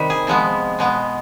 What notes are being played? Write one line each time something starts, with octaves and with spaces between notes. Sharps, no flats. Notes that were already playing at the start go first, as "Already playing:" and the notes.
Already playing: C3 D#3 G3 B4
G#4
C3 F3 G#3 B3
B2 G#3 B3